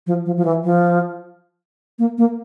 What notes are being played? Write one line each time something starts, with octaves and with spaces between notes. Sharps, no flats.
F3
F3
F3
E3
F3
A#3
A#3